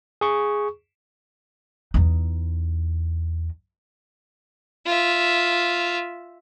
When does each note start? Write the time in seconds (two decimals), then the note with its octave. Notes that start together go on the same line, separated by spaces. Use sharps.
0.21 G#4 C#6
1.94 E2 D#4
4.86 F4 E5